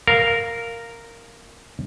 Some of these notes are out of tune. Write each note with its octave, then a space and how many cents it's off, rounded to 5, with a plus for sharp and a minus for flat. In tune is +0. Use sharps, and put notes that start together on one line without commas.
A#4 -5 F5 +0